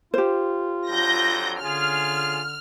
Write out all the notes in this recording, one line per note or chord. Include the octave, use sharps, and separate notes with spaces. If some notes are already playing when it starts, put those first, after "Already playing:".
F4 G4 C5
F2 D3 F#3 G6 A#6
D3 C#4 F4 G#4 F6